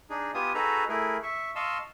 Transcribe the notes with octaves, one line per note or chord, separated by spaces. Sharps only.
D4 D#4 G#4
B3 F4 G4 G#5 D#6
D#4 F#4 G#4 A4 B4 A#5
A3 E4 G#4 A#4
E5 C#6
D#5 F5 A5 C6 C#6 E6